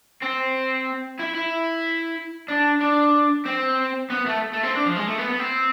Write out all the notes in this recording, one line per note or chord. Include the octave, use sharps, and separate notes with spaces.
C4
E4
E4
D4
D4
C4
B3
A3
A3
C4
D4
F3
G#3
A3
B3
B3
C4